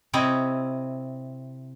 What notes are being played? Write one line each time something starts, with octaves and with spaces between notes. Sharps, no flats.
C3 C4 E4 C#5 D#5